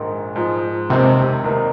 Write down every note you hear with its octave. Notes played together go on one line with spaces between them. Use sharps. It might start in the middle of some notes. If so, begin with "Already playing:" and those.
Already playing: A#1 G#2 D#3 A#3
G#2 F3 G#3
F1 D#2 C3 D#3 G#3 C4
C2 C3 D#3 A#3 D#4